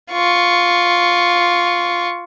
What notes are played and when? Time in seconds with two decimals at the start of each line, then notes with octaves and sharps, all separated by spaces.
0.12 F4 C#6